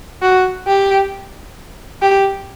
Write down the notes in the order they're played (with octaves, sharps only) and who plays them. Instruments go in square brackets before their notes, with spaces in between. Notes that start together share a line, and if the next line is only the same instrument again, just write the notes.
[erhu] F#4
G4
G4